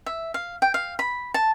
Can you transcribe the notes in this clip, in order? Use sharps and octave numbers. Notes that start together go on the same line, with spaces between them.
E5
F5
G5
F5
B5
A5